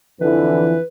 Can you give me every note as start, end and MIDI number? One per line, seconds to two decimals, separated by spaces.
0.20 0.77 41
0.20 0.77 50
0.20 0.77 52
0.20 0.85 71